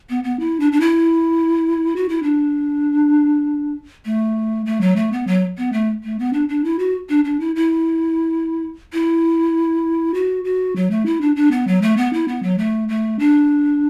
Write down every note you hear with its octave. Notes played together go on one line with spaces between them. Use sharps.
B3
B3
E4
D4
D4
E4
F#4
E4
D4
A3
A3
F#3
A3
B3
F#3
B3
A3
A3
B3
D4
D4
E4
F#4
D4
D4
E4
E4
E4
F#4
F#4
F#3
A3
E4
D4
D4
B3
F#3
A3
B3
E4
B3
F#3
A3
A3
D4